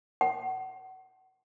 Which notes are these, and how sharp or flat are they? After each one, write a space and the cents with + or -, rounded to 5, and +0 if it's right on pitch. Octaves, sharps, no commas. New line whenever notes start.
F#5 +30